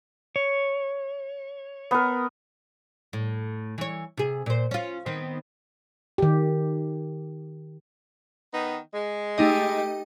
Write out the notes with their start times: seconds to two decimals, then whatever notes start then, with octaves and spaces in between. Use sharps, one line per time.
0.36 C#5
1.91 B3 A#4
3.13 A2
3.78 E3 C#5
4.17 C3 G#4
4.46 A#2 C5
4.71 C#4 F4
5.06 D#3 B3 C4
6.18 D#3 G4
8.54 D#3 B3 D#4
8.94 G#3
9.38 A3 D#4 G4 D#5